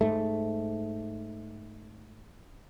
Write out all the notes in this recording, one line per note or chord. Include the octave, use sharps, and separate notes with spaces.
G#2 A3